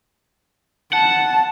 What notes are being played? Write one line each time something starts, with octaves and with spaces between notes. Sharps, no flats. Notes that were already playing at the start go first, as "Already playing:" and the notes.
F#5 A5